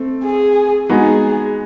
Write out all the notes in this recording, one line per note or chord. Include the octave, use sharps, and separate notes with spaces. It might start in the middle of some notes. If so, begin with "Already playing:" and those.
Already playing: A3 C4
G#4
G#3 B3 D#4 F#4 G#4